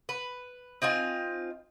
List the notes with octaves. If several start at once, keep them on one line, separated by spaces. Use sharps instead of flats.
B4
C4 D#4 F4 G#5